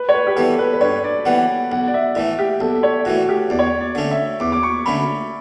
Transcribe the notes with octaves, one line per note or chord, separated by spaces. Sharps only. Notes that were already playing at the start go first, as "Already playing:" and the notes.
Already playing: B4
C#5
B4
G4
E3 G3 B3 A4
B4
B4
G2 C#5
D5
E3 G3 B3 F#5
B1 F#5
D5
E5
A2 E3 A3 E5
G4
B1 A4
C#5
A2 E3 A3 F#4
G4
E2 D5
C#5
D5
D5
D3 A3 C#4
E5
E2 D6
D6
C#6
D3 A3 C#4 B5